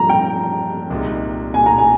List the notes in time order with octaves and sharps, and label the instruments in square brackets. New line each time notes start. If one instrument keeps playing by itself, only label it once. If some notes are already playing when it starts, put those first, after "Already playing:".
Already playing: [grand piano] G2 F3 A#3 [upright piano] A#5
[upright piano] G5
[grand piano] C2 A#2 G#3 D#4
[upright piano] G#5
A#5
G#5